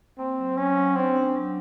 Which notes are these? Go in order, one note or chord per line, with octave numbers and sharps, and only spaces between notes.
A#3 C4
F#3
F#3 C#4
F#3
C4 D4
D4
F#3